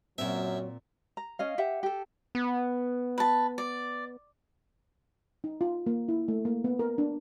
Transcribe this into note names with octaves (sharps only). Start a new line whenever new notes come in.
F#2 A#2 F#3 C4 E5
A#5
C#4 D#5 F5
G4 E5 F#5
G4 A4
B3
B4 A5
D5
D#4
F4
A#3
E4
A3
A#3
B3
A#4
D4